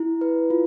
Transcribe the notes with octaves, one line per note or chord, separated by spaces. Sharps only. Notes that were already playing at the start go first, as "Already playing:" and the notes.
Already playing: E4
B4
F4